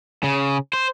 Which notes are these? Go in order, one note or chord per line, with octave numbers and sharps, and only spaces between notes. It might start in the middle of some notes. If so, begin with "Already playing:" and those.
C#3
C5